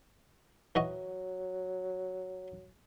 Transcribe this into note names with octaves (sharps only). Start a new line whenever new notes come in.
E3 F#3 F#4 D#5